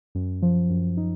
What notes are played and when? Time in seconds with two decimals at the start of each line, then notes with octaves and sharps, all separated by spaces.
0.15 F#2
0.42 F3
0.70 F#2
0.97 D#4